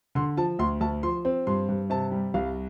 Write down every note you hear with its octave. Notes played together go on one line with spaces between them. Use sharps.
D3 C6
F3 A5
D2 C6
D2 A5
F3 C6
C4
G2 C6
G2
C3 A5
G3
C2 F5